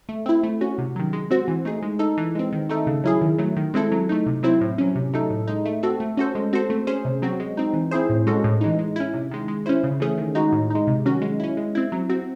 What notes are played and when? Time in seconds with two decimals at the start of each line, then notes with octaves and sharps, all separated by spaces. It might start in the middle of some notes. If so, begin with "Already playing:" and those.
0.09 A3
0.26 C4 E4
0.43 A3
0.61 C#4 F#4
0.78 C3
0.96 D#3 F#3
1.13 G#3
1.31 C4 F#4 C5
1.48 E3
1.65 A3 D#4 G#4
1.83 G#3
1.99 D#4 A4
2.17 E3
2.35 G#3 C4
2.53 D#3
2.69 A3 D#4 A4
2.87 C#3
3.04 F#3 C#4 E4 G#4
3.22 D#3
3.38 F#3 A3
3.57 D#3
3.74 G#3 C4 E4 A4
3.92 F#3
4.09 A3 D#4
4.26 C3
4.43 F#3 C4 E4 C5
4.61 A2
4.78 F#3 C#4
4.95 C3
5.13 F#3 A3 D#4 A4
5.31 A2
5.47 G#3 D#4
5.66 A3
5.83 C4 F#4 A4
6.00 A3
6.17 C#4 F#4 A4 C5
6.35 G#3
6.53 C4 F#4 A4 C5
6.70 A3
6.87 C#4 G#4 C5
7.05 C3
7.22 F#3 C4 F#4
7.40 G#3
7.57 C4 D#4
7.74 E3
7.91 C4 E4 G#4 C5
8.09 A2
8.27 G#3 C#4 F#4 A4
8.44 A2
8.61 E3 G#3 D#4
8.79 G#3
8.96 C#4 E4
9.14 C3
9.31 D#3 G#3
9.48 G#3
9.66 C#4 E4 C5
9.84 C#3
10.00 E3 A3 C#4 G#4
10.18 D#3
10.35 G#3 D#4 F#4
10.52 A2
10.70 G#3 D#4
10.87 C3
11.05 D#3 F#3 C#4 F#4
11.22 G#3
11.40 C#4 E4
11.57 G#3
11.75 C4 E4
11.92 F#3
12.09 C4 F#4